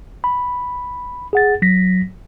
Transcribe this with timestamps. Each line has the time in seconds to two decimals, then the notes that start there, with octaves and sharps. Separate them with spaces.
0.24 B5
1.33 G#4 F#5 A6
1.62 F#3 A#6 B6